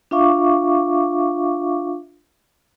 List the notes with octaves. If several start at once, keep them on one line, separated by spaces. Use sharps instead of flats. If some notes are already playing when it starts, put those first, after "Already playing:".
D4 F4 E5 F5 C#6 D6